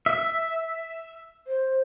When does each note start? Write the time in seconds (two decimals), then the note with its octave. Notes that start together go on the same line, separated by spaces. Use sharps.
0.06 E5
1.47 C5